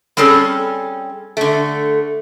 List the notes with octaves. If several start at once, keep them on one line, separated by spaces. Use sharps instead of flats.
G3 C4 C#4 G#4 A4
D3 A3